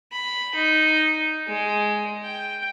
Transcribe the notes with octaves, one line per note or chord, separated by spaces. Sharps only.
B5
D#4
G#3
G5